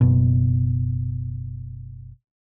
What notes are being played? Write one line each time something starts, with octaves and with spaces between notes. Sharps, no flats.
F#1 B2